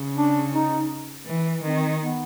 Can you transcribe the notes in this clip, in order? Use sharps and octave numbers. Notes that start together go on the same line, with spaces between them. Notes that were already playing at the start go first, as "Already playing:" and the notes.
Already playing: C#3
D4
D#4
E3
D#3 C4
B3